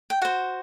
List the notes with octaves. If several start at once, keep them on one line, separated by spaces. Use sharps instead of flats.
G5
F#4 C5 F#5